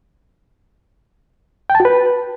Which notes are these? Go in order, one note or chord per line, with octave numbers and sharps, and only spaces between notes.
G5
A5
F#4
B4